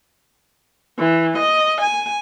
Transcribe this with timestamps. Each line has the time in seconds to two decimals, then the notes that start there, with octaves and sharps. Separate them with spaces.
0.99 E3
1.39 D#5
1.81 G#5